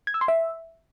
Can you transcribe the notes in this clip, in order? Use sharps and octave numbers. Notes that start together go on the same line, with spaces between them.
G#6
E6
C6
E5